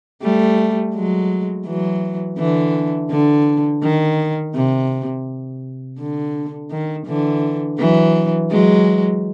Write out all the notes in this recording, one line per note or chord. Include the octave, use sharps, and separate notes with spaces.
G3 A3
F#3 G#3
E3 F#3
D3 E3
D3
D#3
C3
D3
D#3
D3 E3
E3 F#3
F#3 G#3